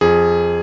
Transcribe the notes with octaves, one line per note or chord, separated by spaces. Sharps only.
F2 G#4